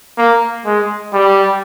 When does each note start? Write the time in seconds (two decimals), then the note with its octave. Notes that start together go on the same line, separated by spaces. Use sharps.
0.18 A#3
0.66 G#3
1.14 G3